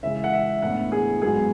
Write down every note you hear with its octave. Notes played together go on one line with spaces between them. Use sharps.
C#3 E3 G#3 E5
F#5
E5
A2 E3 B3 D4 F#5
G#4
G#2 F#3 B3 G#4